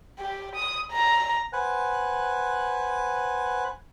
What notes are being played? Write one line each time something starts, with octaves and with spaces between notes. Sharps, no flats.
G4
D#6
A#5
B4 C5 F#5 G#5 F#6